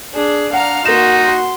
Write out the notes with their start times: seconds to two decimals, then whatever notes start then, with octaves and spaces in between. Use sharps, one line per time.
0.15 D4 G#4
0.53 D4 F5 F#5 A#5 F6
0.85 A#3 D#4 F#4 C6 E7
1.23 C6